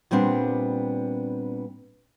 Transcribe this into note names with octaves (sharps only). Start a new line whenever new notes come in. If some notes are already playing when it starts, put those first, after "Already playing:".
A#2 G3 B3 C4 D4